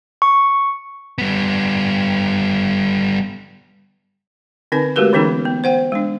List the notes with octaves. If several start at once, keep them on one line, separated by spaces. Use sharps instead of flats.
C#6
G3 B3
D3 C4 D#4 B4 G#5
G#3 A3 F#4 G4 A#4 B4
D3 E3 B3 C#4 D#4 G#4
B3
C5 F#5 G5
G#3 D4